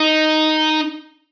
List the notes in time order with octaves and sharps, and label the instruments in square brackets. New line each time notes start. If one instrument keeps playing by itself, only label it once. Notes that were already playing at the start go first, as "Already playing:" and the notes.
Already playing: [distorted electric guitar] D#4